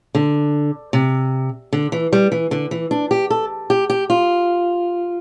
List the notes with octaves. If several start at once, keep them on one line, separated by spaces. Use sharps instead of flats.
D3
C3
D3
E3
G3
E3
D3
E3
D4
G4
A4
G4
G4
F4